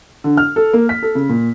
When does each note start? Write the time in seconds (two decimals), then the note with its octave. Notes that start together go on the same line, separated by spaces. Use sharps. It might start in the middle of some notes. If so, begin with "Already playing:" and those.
0.24 D3
0.37 F6
0.56 A4
0.73 A#3
0.89 B6
1.03 A4
1.15 C#3
1.29 A#2